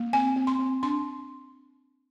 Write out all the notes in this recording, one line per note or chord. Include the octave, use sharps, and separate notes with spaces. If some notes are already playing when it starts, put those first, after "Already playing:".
Already playing: A#3
C4 G#5
C4
C6
C4
D4 C6